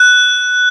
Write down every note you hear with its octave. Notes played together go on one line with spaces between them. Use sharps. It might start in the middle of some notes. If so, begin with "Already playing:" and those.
Already playing: F#6